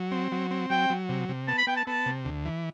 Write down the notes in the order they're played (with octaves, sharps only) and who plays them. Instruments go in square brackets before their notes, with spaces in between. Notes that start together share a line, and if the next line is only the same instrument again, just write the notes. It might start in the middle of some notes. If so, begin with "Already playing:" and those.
Already playing: [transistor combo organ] F#3
C4
F#3
C4
[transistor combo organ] F#3 [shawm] G5
[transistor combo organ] F#3
C3
C3
[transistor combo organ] B3 [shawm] A5
[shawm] B5
[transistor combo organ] B3 [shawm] G5
[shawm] A5
[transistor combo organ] B3 [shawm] A5
[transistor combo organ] C3
D2
E3